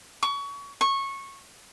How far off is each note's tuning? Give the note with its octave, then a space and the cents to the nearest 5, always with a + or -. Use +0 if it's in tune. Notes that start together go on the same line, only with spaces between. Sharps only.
C#6 +25
C#6 -15